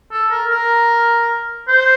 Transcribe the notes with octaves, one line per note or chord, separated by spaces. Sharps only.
A4
A#4
A#4
C5